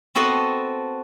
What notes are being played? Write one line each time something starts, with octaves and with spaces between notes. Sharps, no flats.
B3 C4 F#4 A4 D#5 F#5